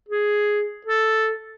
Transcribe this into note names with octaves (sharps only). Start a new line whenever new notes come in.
G#4
A4